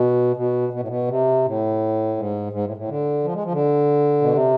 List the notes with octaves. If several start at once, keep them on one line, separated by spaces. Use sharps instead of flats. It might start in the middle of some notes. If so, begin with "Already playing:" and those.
Already playing: B2
B2
B2
A2
B2
C3
A2
G#2
G#2
A2
A2
D3
F3
G#3
F3
D3
B2
C3